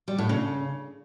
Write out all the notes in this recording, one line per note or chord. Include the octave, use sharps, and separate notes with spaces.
G3
A2
C#3